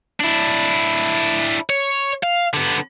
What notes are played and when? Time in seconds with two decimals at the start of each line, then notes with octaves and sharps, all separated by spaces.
0.20 D4 E4
1.70 C#5
2.23 F5
2.54 D3 B3